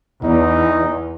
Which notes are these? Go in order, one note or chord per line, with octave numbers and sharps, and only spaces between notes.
E2 D#4